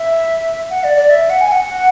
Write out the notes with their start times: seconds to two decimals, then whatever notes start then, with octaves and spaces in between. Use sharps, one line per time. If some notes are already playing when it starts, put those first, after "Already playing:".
Already playing: E5
0.70 F#5
0.84 D5
0.97 D5
1.10 E5
1.30 F#5
1.41 G#5
1.52 F#5